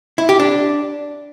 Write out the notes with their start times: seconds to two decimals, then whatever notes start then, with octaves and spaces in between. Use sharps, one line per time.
0.18 E4
0.29 G4
0.40 D4